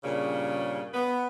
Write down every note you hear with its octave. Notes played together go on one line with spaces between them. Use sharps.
G2 A#2 C#3
B3